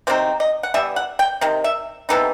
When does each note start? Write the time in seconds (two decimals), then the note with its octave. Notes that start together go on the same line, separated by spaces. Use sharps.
0.07 C3 F#3 C4 D#4 C5
0.40 D#5
0.63 F#5
0.74 E3 G3 B3 E5
0.96 F#5
1.19 G5
1.41 C3 D#3
1.64 E5
2.09 C3 E3 B3 D#4 A4